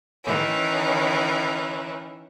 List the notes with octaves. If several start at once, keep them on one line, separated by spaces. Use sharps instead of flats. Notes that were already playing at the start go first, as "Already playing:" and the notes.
D#3 E3 C#4